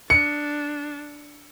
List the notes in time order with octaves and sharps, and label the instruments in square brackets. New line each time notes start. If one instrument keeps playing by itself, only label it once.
[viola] D4 [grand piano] C#7